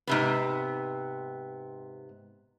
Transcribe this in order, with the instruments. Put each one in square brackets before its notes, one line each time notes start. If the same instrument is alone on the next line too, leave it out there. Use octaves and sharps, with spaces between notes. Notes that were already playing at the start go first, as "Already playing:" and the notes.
[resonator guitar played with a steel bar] G#2 C3 B3